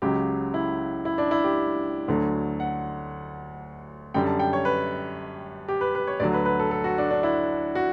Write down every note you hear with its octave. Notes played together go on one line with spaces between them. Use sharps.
C#2 C#3 F#3 G4
E4
E4
D4
E4
G4
D2 D3 F#3
F#5
F#2 D3 G3 G5
A5
G5
C#5
B4
G4
B4
B4
C#5
D2 D3 F#3 D5
B4
B4
A4
A4
F#4
D4
D4
E4
F#4